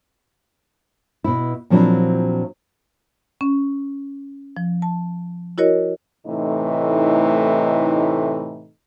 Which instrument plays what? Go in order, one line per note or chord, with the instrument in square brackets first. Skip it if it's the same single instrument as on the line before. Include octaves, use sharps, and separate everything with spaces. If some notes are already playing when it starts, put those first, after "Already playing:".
[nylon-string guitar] B2 E4
A#2 F3 F#3 C4 D4 E4
[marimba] C#4
F3
A5
E4 F#4 A#4 C#5 D#5
[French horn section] A2 C3 E3 A3 D#4